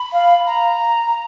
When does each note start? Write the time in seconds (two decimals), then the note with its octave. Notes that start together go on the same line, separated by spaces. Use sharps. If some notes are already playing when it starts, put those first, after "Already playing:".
Already playing: B5
0.13 F5
0.47 A#5